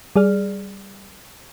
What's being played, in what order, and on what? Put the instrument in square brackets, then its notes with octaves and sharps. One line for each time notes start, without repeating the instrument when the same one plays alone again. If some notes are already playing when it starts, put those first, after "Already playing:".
[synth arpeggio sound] G3 G#4 D5 F6